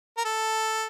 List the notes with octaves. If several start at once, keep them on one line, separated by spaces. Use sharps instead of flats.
A#4
A4